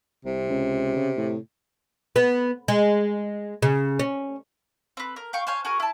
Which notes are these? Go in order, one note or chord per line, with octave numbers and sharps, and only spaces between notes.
C2 C3
C#2
C#3
A2
B3
G#3
C#3
C#4
C4 B4
A#4
F5 G5 C#6
C5 C#5 F5 G#5
F#4 G#4 A#4 G#5
E4 A5